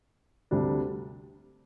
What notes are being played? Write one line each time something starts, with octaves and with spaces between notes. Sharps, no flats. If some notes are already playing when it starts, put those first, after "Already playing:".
D2 C3 G3 D4